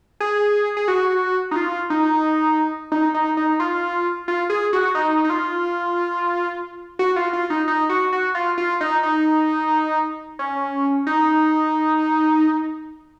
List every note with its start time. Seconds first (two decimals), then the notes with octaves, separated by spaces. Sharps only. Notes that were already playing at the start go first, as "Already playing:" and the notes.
0.20 G#4
0.77 G#4
0.88 F#4
1.51 D#4
1.56 F4
1.90 D#4
2.92 D#4
3.14 D#4
3.37 D#4
3.60 F4
4.28 F4
4.50 G#4
4.73 F#4
4.95 D#4
5.24 D#4
5.30 F4
6.99 F#4
7.16 F4
7.33 F4
7.50 D#4
7.68 D#4
7.89 F#4
8.13 F#4
8.35 F4
8.58 F4
8.81 D#4
9.03 D#4
10.39 C#4
11.07 D#4